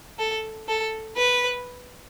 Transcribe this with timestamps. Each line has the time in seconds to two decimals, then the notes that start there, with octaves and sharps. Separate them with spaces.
0.19 A4
0.68 A4
1.17 B4